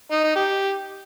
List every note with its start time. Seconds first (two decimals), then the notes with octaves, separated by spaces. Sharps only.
0.12 D#4
0.24 D#4
0.36 G4